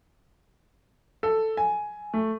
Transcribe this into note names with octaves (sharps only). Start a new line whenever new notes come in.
A4
G#5
A3